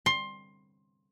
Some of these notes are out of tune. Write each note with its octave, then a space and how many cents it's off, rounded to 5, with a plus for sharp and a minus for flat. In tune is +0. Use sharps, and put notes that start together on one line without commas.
C6 +20